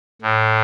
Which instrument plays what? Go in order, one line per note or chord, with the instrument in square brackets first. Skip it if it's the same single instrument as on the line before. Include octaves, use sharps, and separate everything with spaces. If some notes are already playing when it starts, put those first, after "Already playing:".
[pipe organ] A2